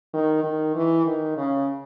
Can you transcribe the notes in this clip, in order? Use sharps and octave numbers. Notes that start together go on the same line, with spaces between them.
D#3
D#3
E3
D#3
C#3